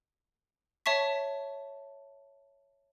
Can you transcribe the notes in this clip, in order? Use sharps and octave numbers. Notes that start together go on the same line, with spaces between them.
C#5 E5 A5 C#6 B6